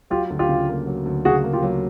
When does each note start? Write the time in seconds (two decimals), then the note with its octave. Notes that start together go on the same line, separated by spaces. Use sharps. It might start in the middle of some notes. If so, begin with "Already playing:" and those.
0.10 F#3 F4 G4
0.30 D2
0.39 F4 G4
0.49 C#3
0.68 A#3
0.87 F#3
1.05 D2
1.25 C#3 F#4 G#4
1.44 A#3
1.53 F4 G4
1.62 F#3